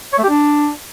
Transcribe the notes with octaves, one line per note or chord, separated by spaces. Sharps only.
C#5
A3
G4
D4